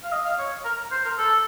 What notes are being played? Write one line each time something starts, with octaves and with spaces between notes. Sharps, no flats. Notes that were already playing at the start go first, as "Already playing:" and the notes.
F5
D#5
F5
C#5
A#4
C5
A#4
A4